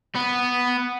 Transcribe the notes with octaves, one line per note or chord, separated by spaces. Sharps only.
B3